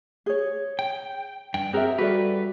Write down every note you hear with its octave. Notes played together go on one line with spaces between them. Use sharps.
G#4 C#5
G5
G2 G5
C4 F#4 G#4 A#4 E5
G3 F#4 A4 B4 D5